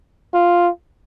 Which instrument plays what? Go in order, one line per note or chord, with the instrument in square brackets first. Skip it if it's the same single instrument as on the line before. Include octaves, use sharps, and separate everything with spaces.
[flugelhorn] F4